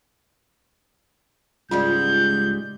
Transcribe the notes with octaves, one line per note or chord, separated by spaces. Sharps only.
C#2 G#2 G3 G#3 F4 G6